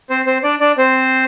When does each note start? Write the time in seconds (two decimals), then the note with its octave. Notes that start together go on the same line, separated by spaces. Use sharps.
0.10 C4 C5
0.26 C4 C5
0.43 D4 D5
0.60 D4 D5
0.77 C4 C5